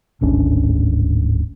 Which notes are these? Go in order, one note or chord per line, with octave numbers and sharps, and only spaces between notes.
D1 G#1 C#4 D4